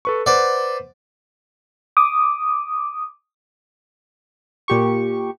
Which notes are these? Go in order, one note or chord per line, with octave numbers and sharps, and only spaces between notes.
A4 B4 C#6
B4 C5 D5 F#5
D6 D#6
A#2 G4 C#6